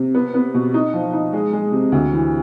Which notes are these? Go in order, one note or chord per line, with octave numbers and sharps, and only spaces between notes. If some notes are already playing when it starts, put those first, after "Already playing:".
Already playing: C3
B3
B3
B2
D#4
F3
D#4
G#3
G#3
C3
D2
E3